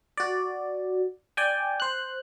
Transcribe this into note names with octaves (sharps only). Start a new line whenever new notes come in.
F#4 D5
D5 G5 G#5
C5 F#6